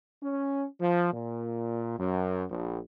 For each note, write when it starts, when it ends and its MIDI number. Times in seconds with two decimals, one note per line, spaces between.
0.23 0.65 61
0.81 1.09 53
1.14 1.99 46
1.99 2.45 42
2.50 2.80 34